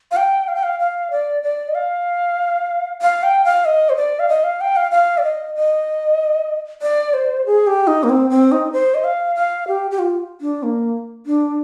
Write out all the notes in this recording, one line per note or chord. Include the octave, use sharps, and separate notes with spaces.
F5
G5
F5
G5
F5
F5
D5
D5
D#5
F5
F5
G5
F5
D#5
C5
D5
F5
D#5
F5
G5
F5
F5
D5
D#5
D#5
D5
C5
G#4
G4
D#4
A#3
C4
C4
D#4
C5
D#5
F5
F5
G4
G4
F4
D4
A#3
D4